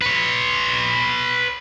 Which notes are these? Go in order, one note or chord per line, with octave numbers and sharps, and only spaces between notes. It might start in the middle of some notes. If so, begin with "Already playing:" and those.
B4 C#5